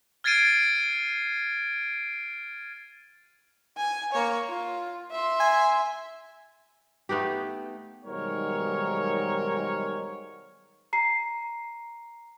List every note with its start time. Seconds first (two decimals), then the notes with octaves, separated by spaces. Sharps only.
0.24 F6 G#6 A6 C7 D7 D#7
3.77 G#5
4.12 A#3 C#5
4.48 F4
5.11 E5 C6
5.40 G#5
7.09 A3 B3 D#4 G4
8.05 B1 G#2 D#3 G3 A#4 C#5
10.93 A#5 C7